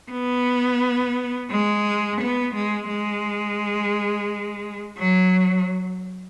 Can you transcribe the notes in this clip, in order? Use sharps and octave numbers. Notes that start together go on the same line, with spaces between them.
B3
G#3
B3
G#3
G#3
F#3